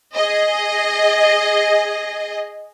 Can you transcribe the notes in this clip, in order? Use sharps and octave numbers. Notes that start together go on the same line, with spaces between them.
G#4 D#5